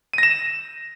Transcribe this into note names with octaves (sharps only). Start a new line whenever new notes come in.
A#6 D#7 E7